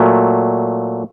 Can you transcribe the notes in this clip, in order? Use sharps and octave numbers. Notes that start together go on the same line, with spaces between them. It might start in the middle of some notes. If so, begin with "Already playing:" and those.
Already playing: A#2 F#3 A3